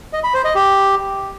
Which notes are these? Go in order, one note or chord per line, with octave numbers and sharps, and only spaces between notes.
D#5
B5
C5
D#5
G4